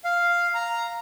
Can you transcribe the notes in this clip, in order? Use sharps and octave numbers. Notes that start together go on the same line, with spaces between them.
F5
A#5